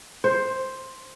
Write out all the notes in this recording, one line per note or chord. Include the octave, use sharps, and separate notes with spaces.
C5